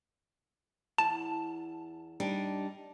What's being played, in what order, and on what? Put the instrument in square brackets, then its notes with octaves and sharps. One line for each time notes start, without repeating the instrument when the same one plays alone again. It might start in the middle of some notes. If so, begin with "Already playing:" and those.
[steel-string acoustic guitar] E2 [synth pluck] A5
[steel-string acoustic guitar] G3 D4 D#4